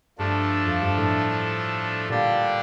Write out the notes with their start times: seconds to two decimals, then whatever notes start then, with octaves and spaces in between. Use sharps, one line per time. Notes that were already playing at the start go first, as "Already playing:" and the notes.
0.18 G2 F3 A3 D4 A4
0.66 F2
0.81 G2
0.97 A2
2.09 A#2 D3 G3 D4 G4 D5